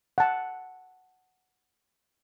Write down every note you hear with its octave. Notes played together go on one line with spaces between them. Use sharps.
F#5 A5